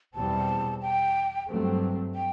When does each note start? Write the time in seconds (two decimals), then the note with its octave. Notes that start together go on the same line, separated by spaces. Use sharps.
0.14 E2 B2 G3 C4 A5
0.82 G5
1.48 G2 F#3 A3 C4
2.15 G5